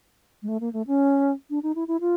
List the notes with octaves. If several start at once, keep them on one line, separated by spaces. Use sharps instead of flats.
G#3
A3
A#3
A3
C#4
D4
D#4
E4
E4
F4